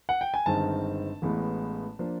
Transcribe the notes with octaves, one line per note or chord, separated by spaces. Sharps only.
F#5
G5
G#5
G1 G2 D#3 G#3 C4 A5
A1 A2 E3 G#3 B3
F3 A#3 D4